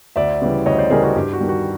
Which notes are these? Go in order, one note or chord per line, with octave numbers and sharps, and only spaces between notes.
D2 D5 E5
C#3 E3 G3
D2 C#5 D#5
C5 D5
C#3 E3 G3 G#4 A#4
F#4 G#4
G2 G4
F#4
D#3 G3
F#4